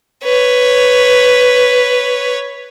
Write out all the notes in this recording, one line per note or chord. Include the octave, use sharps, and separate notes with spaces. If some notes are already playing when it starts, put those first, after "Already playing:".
B4 C#5